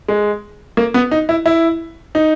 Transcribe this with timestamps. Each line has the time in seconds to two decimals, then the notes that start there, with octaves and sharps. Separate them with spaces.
0.08 G#3
0.77 A#3
0.94 B3
1.11 D#4
1.29 E4
1.46 E4
2.15 D#4